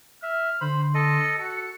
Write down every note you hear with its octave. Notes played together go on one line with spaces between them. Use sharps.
E5 F6
D3 C5 B5 C6
A4 D#5
F#4 A4 C#7